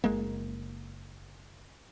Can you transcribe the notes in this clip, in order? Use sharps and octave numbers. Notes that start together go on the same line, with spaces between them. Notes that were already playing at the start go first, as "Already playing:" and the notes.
F#1 G#3 A#3